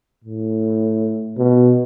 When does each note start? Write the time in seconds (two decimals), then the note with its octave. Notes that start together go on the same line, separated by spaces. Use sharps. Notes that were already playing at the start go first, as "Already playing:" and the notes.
0.24 A2
1.38 B2